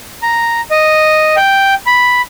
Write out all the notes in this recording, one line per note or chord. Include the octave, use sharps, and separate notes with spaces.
A#5
D#5
G5
B5